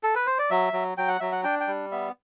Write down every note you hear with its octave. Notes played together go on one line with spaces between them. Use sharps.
A4
B4
C5
D5
F#3 E5
F#3
F#3 G5
F#5
F#3 E5
F#5
D4 G5
G5
G3
B3 E5